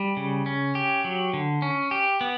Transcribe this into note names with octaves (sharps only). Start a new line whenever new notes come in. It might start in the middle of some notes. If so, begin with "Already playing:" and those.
Already playing: G3
C#3
C#4
G4
F#3
D3
C#4
G4
B3